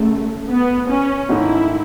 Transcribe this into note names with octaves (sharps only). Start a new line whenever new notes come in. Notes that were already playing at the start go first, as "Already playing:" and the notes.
Already playing: F#2 C#3 G#3 A3
B3
C#4
G#2 D#3 A3 D#4 E4